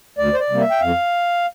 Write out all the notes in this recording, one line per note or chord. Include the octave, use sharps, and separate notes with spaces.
D2 D5
C5
D5
C3 G3 A#3
E5
G5
F2 F5